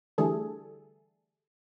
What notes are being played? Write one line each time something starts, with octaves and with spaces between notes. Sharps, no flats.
D3 E3 G3 A3 G#4 A4